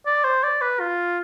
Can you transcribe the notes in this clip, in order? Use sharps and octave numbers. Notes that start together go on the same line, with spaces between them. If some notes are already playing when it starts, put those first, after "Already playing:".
D5
C5
D5
B4
F4